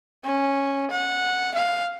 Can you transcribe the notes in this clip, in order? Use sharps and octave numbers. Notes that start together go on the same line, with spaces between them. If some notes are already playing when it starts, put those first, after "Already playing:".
C#4
F#5
F5